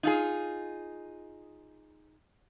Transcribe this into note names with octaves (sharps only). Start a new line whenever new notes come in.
D#4 F4 G#4